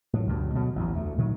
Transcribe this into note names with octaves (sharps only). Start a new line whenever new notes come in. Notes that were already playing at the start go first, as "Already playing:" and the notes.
A2 F#3
D2 G2 B2
B2 D3 F#3
A1 E2
D2 A3
A#2 D#3 F#3 A3